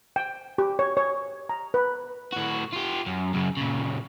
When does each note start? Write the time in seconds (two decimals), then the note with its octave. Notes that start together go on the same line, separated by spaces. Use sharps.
0.16 G5
0.58 G4
0.79 C#5
0.97 C#5
1.49 A#5
1.74 B4
2.32 A2 F#4
2.73 F4 G4
3.07 F#2
3.34 F#2 C#3
3.57 A#2 C#3